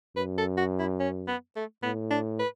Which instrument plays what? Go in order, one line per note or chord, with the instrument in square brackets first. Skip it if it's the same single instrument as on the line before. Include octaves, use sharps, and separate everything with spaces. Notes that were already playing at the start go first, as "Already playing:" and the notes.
[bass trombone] F#2 [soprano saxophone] B4
[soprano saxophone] A4
F#4
E4
C#4
B3
A3
[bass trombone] A2 [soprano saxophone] B3
[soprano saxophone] D4
B4